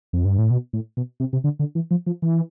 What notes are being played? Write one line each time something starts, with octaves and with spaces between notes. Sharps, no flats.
F2
G2
A2
B2
A2
B2
C3
C3
D3
D3
E3
F3
F3
E3